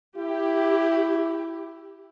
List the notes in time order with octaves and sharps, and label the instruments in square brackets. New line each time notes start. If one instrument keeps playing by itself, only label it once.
[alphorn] E4 [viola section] G4